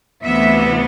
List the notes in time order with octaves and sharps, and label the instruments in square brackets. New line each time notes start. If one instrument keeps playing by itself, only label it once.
[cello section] D2 C3 E3 B3 E5